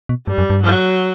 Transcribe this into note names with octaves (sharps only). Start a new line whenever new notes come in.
B2
G2 G3
F#2
G2
F#3